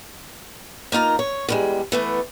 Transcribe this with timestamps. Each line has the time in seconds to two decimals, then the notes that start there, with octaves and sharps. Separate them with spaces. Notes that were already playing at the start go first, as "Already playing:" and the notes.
0.92 A#3 D#4 F4 A#5
1.19 C#5
1.49 E2 G3 G#3
1.92 E3 A3 B3